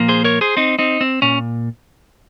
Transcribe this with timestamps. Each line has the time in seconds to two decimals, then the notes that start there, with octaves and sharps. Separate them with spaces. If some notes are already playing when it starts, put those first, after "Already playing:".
Already playing: A#2 F3 A#3
0.08 G#4 C5
0.24 A#4 C#5
0.41 G#4 C5
0.57 C4 D#4
0.79 C4 D#4
1.01 C4
1.22 A#2 C#4